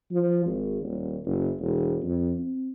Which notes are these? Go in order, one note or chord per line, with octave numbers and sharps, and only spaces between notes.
F3
G#1
D#1
F#1
E1
F2
C4